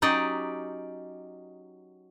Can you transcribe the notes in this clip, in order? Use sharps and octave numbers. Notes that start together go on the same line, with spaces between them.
F#3 C#4 D#4 G4 D5 D#5